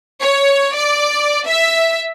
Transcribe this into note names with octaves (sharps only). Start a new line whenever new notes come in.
C#5
D5
E5